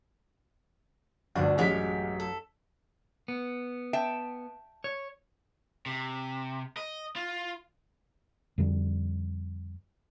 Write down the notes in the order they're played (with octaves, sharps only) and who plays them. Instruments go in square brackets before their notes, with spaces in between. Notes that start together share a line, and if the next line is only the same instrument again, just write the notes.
[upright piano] G1 D2 [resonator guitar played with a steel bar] D4
[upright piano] A1 F#2 B6 [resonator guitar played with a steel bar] G#3 C#4 G4
[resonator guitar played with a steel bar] A4
[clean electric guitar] B3
[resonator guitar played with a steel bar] E5 G5 A5
[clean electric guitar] C#5
[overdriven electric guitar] C3
D#5
F4
[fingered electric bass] F2 D3 G3